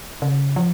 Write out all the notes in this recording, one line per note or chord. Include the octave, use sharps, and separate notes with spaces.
C#3
F3